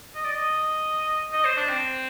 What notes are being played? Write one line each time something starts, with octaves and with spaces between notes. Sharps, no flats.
D#5
D5
D#5
D#5
C5
D4
C4